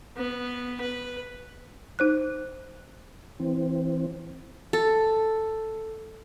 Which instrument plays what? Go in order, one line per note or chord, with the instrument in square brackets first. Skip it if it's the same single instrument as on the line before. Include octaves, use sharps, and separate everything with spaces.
[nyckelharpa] B3
B4
[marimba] D#4 C5 F#6
[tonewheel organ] E3 C4
[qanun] A4